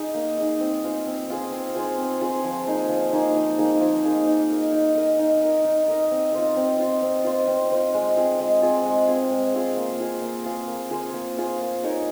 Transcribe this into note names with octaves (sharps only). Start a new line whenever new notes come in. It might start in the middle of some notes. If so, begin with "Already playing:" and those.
Already playing: D#4 G#4 D#5
A#3
D#4 G#4 D#5
C4
F4 G#4 C5
C4
F4 G#4 C5
C4
F4 G#4 C5
C4
F4 G#4 C5
F3
A#3 D#4 G#4
F3
A#3 D#4 G#4
F3
A#3 D#4 G#4
F3
A#3 D#4 G#4
D#4
A#4 D#5
D#4
A#4 D#5
D#4
A#4 D#5
D#4
A#4 D#5
C4
F4 C5 D#5
C4
F4 C5 D#5
C4
F4 C5 D#5
C4
F4 C5 D#5
G#3
C4 F4 G#4
G#3
C4 F4 G#4
G#3
C4 F4 G#4
G#3
C4 F4 G#4
A#3
F4 G#4 C5
A#3
F4 G#4 C5
A#3
F4 G#4 C5
A#3
F4 G#4 C5
A#3
D#4 A#4 C#5